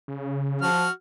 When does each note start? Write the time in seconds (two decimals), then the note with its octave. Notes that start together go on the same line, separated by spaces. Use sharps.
0.08 C#3
0.61 F3 F#4 F6